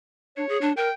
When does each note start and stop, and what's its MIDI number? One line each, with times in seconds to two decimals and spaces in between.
0.37 0.45 62
0.37 0.69 73
0.49 0.58 68
0.61 0.72 62
0.77 0.88 70
0.77 0.93 79